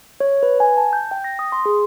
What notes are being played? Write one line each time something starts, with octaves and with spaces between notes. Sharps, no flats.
C#5
B4
G#5
A5
G6
G5
A#6
D#6
C6
G#4